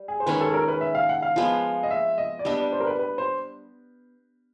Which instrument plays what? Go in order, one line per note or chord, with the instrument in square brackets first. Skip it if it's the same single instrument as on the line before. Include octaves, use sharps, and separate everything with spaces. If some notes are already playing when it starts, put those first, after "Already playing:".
Already playing: [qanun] G3
[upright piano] G#4
C5
[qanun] D#3 G#3 C#4 [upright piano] B4
[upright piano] A4
A#4
B4
E5
F5
F#5
F5
[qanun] F3 G#3 B3
[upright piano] D#5
E5
D#5
D5
[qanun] G3 B3 D4 [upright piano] D#5
[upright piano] D5
C5
A#4
B4
B4
C5